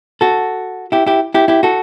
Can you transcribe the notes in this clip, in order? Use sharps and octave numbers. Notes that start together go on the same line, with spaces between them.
F#4 A4
E4 G4
E4 G4
E4 G4
E4 G4
F#4 A4